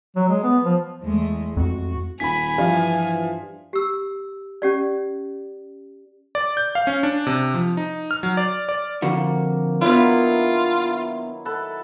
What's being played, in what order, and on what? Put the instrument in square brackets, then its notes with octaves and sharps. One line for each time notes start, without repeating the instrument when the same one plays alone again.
[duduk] F#3
G#3
B3
F3
[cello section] E2 G#3 A3
[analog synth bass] F2 [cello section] F#4
[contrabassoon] D#1 [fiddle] G#5 [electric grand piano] B5 B6
[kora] G2 [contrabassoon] E3 [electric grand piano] F3 F5
[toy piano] G4 E6
C#4 G4 D5
[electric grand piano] D5
G6
F5
C#4
D4
C3
F3
D#4
F6
F#3
D5
D5
[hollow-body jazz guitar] F2 D3 F#4 [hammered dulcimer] A#3
[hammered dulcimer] D#3 F#3 E4 [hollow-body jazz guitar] B3 D4 [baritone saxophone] F4
[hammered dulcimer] A4 B4 F#5